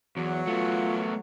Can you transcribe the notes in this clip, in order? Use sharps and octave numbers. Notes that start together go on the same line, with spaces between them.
E2 F#3
A3 B3 F4